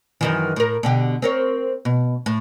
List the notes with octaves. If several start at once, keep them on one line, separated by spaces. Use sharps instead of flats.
F#2 D#3 E3
A2 A#4
B2 D3 G4
C4 A#4 C#5
B2
A2